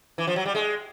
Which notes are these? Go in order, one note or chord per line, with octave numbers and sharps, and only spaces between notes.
E3
F3
F#3
G3
G#3